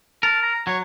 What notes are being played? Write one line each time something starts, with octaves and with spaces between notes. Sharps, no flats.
A#4 A5
A#5
F#3 C#5